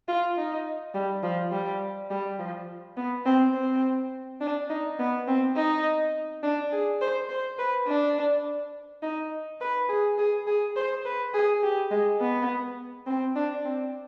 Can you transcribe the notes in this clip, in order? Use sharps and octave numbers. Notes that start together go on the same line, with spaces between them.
F4
D#4
G3
F3
G3
G3
F3
B3
C4
C4
D4
D#4
B3
C4
D#4
D4
G#4
C5
C5
B4
D4
D#4
B4
G#4
G#4
G#4
C5
B4
G#4
G4
G#3
B3
C4
D4
C4